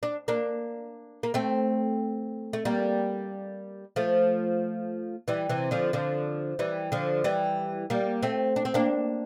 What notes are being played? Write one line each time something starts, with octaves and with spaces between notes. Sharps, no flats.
D4
A#3 D4
A#3
A3 C4
A3
G3 A#3
F3 A3
E3 G3
C3 E3
D3 F3
D3 F3
E3 G3
D3 F3
E3 G3
G3 A#3
A3 C4
D4
C4
A#3 D4